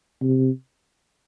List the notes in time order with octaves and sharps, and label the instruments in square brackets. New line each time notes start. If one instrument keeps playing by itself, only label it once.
[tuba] C3